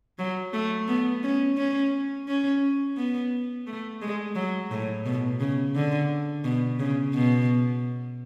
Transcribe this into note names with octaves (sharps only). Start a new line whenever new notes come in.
F#3
A3
B3
C#4
C#4
C#4
B3
A3
G#3
F#3
A2
B2
C#3
D3
B2
C#3
B2